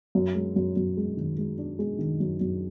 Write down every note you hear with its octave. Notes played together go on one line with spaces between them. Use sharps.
F#2
G#3
F#2
F#2
G#3
D#3
G#3
D4
G#3
D#3
F#2
F#2